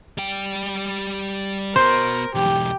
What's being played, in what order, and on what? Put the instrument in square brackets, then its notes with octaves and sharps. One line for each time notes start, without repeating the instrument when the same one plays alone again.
[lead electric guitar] G3 G5
[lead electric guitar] B3 F#4 [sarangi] A#4 [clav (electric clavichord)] C5
[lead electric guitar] B1 E2 [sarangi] G4